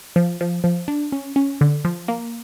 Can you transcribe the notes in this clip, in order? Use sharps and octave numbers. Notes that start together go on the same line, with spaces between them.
F3
F3
F3
D4
C#4
C#4
D3
F3
A#3